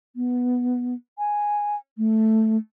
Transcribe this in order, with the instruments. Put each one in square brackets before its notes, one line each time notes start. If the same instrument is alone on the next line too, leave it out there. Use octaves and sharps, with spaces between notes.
[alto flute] B3
G#5
A3